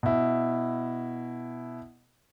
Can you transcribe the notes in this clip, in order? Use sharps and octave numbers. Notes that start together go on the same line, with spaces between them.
B2 E4